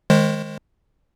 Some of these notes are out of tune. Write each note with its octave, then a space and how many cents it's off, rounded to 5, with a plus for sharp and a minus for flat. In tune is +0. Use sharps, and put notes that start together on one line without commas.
D#3 +10 G#3 +0 C5 +30